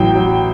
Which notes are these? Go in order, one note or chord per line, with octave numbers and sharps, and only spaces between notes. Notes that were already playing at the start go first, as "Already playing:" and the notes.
Already playing: A1 F#3 G5
F#3